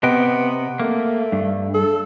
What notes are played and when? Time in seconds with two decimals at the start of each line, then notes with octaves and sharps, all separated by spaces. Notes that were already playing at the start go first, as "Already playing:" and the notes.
0.03 C3 B3 D#5 G5
0.80 A3 A#3
1.32 G2
1.74 A4